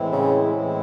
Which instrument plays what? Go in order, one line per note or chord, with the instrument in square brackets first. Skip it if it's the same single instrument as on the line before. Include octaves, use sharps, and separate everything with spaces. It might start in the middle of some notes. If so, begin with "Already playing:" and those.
Already playing: [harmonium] A2 E3 G#3 C4 E4
[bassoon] C#3
[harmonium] A2 E3 G#3 C4 E4